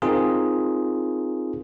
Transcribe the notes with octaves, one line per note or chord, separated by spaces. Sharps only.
C4 D#4 F4 G#4 A#4